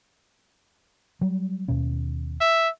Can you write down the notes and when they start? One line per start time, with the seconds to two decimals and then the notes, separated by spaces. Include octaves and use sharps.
1.21 F#3 G3
1.68 D#2 B2 C#4
2.41 E5